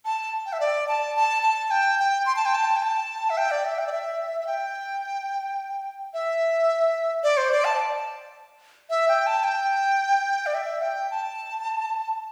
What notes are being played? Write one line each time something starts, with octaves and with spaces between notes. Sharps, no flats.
A5
G5
E5
D5
A5
A5
A5
G5
G5
C6
A5
G5
A5
G5
A5
E5
G5
D5
E5
G5
D5
E5
E5
G5
E5
D5
C5
D5
A5
E5
G5
A5
G5
D5
E5
G5
A5